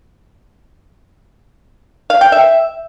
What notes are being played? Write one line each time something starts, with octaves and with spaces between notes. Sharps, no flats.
F5
G5
E5